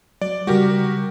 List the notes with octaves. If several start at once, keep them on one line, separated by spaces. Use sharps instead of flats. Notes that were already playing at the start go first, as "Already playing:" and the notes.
F#3 D5
C#3 G3 F#4 G4 A#4